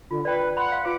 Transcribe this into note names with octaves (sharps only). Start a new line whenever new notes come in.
D3 F4
B4 D5 G5
F#5 B5 C6
F5
F4 B4 D6